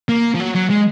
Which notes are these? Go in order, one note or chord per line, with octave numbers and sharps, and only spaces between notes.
A#3
F3
F#3
F#3
G#3